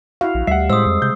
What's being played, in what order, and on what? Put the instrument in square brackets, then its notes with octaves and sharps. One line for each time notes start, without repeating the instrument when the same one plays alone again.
[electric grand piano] E4 F#4 [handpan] F5
[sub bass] A#1
[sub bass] D2 [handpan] G3 [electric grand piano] E5 F#5 [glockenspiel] C7
[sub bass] A2 [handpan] G#3 C5 [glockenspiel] D#6 E6
[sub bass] F2
[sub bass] C3 [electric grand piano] G6